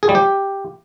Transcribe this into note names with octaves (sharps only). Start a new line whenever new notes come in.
G#4
G3
G4